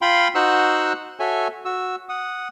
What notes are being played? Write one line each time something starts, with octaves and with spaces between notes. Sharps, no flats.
F4 F5 G5 B5 C6
D#4 F#4 C5 F#5 E6 F#6
F#4 A4 C#5 E5 G#5
F#4 E6
F#5 D#6